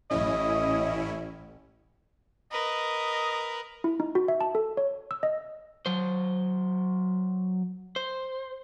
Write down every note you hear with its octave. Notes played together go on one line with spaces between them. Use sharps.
A1 A2 C#4 E4 D#5
A#4 B4 D#5
E4
D#4
F#4
E5
A5
A4
C#5
E6
D#5
F#3 C5
C5